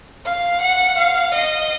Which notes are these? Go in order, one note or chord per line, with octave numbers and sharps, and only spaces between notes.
F5
F#5
F5
D#5